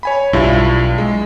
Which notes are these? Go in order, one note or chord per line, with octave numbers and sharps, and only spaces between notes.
C#5 G#5 B5
B1 G2 E4 F4
G#3